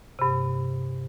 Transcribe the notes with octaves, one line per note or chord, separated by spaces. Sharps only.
G2 C3